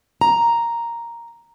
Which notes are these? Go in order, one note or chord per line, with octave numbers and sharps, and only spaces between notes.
A#5